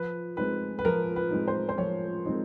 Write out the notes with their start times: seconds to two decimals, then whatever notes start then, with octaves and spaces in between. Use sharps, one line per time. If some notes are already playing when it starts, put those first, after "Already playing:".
Already playing: F3 B4
0.37 G#3 C4 D#4 B4
0.79 B4
0.85 F3 A#4
1.16 B4
1.31 G#3 C4 D#4
1.48 C5
1.69 C5
1.78 F3 C#5
2.25 G#3 C4 D#4